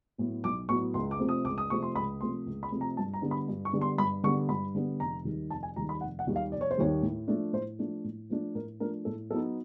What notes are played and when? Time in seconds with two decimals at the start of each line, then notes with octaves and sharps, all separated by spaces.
0.18 A2 F#3 B3
0.44 B1 D6
0.69 A2 F#3 B3 C#6
0.94 C#2 C6
1.11 D6
1.20 C3 F3 A3 C4
1.29 D#6
1.45 C#2 D6
1.58 D#6
1.70 C3 F3 A3 C4 C#6
1.83 C6
1.95 C#2 B5
2.21 C3 F3 A3 C4 C6
2.46 C#2
2.63 B5
2.72 C3 F3 A3 C4
2.81 A#5
2.97 G2 A5
3.14 A#5
3.22 D3 G3 B3 D4
3.31 B5
3.48 G2
3.65 C#6
3.73 D3 G3 B3 D4
3.81 C6
3.98 G2 B5
4.24 D3 G3 B3 D4 C#6
4.49 G2 B5
4.75 D3 G3 B3 D4
5.00 F1 A#5
5.25 D#2 D#3 G3
5.50 F1 A5
5.63 G#5
5.76 D#2 D#3 G3 A#5
5.89 B5
6.01 F1 F#5
6.19 F#5
6.27 D#2 D#3 G3
6.36 F5
6.52 F1 D5
6.61 C#5
6.71 C5
6.77 D#2 D#3 G3 C#5
7.02 A2
7.28 F3 A3 D4
7.53 A2 C5
7.79 F3 A3 D4
8.04 A2
8.30 F3 A3 D4
8.55 A2 A#4
8.80 F3 A3 D4 A#4
9.05 A2 A4
9.31 F#3 B3 D#4 A4